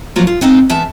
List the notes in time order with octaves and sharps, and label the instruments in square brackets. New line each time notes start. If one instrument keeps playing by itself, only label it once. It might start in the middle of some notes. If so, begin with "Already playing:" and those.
[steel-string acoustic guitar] D#3 F3 F#3 A#3 F4 A#4
F4
B3 C4 D#4 F5
E2 B3 E5 A5